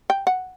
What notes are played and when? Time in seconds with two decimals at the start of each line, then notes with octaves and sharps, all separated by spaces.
0.10 G5
0.27 F#5